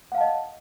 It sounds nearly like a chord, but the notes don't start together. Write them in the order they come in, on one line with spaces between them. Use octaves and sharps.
F#5 F5 A5 D#5